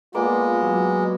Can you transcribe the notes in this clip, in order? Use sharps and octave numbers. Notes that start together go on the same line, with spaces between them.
G#3 A#3 B3 F4 D5
F#3